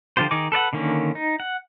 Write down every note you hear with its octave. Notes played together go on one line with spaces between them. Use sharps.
D3 F3 F4 G4 C5
D#3 D#4 G#4 D6
A4 B4 D5 F#5
D3 D#3 A#3 C#4
D#4
F#5